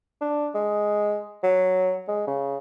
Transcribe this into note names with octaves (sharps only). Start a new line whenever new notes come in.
D4
G#3
F#3
G#3
C#3